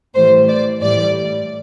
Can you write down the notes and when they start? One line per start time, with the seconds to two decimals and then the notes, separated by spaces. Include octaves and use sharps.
0.15 A2 E3 G3 C5
0.48 D5
0.81 A2 E3 G3 D5